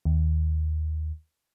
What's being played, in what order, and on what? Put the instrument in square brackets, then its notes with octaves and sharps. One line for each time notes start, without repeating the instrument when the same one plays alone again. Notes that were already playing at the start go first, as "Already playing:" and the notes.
[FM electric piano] D#2